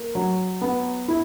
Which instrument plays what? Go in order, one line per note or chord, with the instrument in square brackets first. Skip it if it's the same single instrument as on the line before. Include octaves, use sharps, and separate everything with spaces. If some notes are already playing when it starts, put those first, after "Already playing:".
Already playing: [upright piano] A#3
F#3
B3
E4